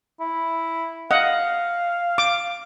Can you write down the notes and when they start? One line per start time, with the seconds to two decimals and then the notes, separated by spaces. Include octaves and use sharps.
0.20 E4
1.11 D#5 F5 F#5
2.18 D6